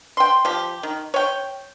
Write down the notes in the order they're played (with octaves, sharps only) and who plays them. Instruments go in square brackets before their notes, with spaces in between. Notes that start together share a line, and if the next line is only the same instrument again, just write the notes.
[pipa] G5 C6
F3 G4
D#3
C#5 G5